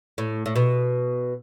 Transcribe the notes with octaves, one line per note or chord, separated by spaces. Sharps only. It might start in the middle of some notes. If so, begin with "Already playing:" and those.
A2
A2
B2